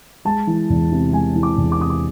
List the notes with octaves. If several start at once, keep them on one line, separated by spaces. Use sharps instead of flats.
G#3 A5
E3
E2
C3
G#3 G#5
E3
D6
E2
D6
C3 D#6
D6